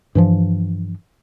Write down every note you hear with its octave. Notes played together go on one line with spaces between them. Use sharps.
G2 E3 F3